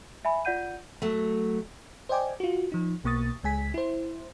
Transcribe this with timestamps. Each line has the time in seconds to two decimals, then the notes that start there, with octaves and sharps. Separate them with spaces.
0.25 E5 G#5 B5
0.45 F4 D5 F#5 G6 D#7
1.02 F#3 A3
2.09 C5 D5 D#5 G5 G#5 D6
2.40 F4 F#4
2.72 F3 D#4
3.04 B1 B2 A#3 C#6 D#6 A6
3.44 C#2 G#3 G#5 B6
3.74 E4 C5